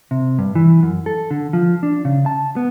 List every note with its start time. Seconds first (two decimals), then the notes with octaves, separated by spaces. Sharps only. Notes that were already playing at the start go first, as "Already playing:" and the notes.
0.11 C3
0.39 G2
0.55 E3
0.83 F#2
1.06 A4
1.31 D3
1.53 F3
1.83 D4
2.05 C#3
2.26 A5
2.56 B3